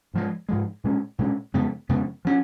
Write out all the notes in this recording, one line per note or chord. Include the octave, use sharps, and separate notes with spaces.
G#2 F3 G#3
G#2 F3 G#3
A#2 G#3 C#4
A#2 G#3 C#4
F2 C#3 G#3 B3
F2 C#3 G#3 B3
F3 A#3 C#4